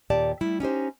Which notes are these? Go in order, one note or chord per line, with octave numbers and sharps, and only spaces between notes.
D#2 A#2 G4 D5 A5
G3 A3 E4
C#4 D#4 G4 C5